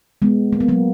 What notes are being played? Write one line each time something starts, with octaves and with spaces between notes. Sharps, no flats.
G#3 B3
A#3
B3
F#3 A#3